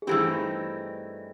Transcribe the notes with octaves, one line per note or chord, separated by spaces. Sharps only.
G#4
G2 E3 A3 C4 D#4 G4